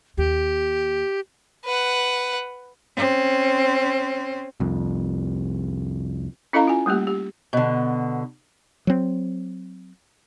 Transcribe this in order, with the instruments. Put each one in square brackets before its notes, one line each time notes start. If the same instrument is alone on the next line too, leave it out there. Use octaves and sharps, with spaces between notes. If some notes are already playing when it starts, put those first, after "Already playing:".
[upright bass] D#2 [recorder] G4
[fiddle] B4 F#5
[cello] C4 C#4
[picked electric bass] C2 F2
[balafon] C#4 E4 A4 D#5 F5 A#5
F4 G#5
G3 A3 A#3 G4
G4
[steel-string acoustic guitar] B2 D3
[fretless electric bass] F#3 C4